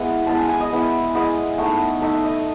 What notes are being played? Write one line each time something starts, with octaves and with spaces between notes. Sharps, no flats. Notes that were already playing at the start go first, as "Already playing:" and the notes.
Already playing: G#3 B3 E4 F#5 G#5
G#3 B3 E4 A5
G#5
G#5
D#5
G#3 B3 E4
G#3 B3 E4 D#5
A3 D#4 F#5
A3 D#4 E5
D#5